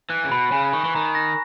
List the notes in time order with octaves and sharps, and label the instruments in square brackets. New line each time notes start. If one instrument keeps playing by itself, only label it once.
[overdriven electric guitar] E3 [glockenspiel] F#6
[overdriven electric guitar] C#3
[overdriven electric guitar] B2 [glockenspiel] B5
[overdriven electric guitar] C#3 [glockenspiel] G#5
[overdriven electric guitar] D#3 [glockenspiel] C#6
[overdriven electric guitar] E3
[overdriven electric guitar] D#3 [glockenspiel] A#5
[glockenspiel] A#6